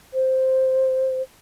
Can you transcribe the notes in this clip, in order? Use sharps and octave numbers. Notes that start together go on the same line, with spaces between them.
C5